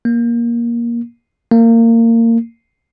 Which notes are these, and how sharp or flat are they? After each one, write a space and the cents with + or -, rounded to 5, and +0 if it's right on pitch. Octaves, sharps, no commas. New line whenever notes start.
A#3 +15
A#3 -25